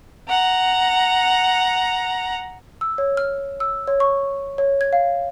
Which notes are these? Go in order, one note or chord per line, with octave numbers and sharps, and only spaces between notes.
F#5 A#5
E6
C#5
F6
E6
C#5
C#6
C#5
G#6
F5